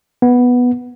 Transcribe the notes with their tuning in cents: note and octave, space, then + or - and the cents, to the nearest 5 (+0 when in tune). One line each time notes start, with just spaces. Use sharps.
B3 -5